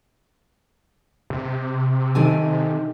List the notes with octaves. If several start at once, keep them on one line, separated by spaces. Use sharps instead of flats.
C3
D#3 A4 G#5